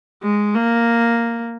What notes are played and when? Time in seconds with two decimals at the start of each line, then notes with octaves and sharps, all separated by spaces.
0.23 G#3
0.55 A#3